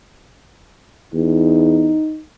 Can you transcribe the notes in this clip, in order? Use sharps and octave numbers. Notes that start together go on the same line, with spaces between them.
E2 D#4